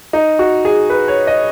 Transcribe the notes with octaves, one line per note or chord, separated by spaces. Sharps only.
D#4
F#4
G#4
B4
C#5
D#5